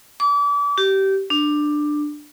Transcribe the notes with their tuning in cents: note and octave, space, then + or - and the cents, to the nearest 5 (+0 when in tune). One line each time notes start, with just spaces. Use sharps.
D6 -35
G4 -20
D4 +15